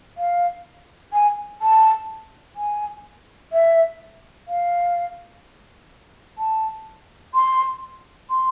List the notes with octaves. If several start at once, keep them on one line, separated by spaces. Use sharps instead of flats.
F5
G#5
A5
G#5
E5
F5
A5
C6
C6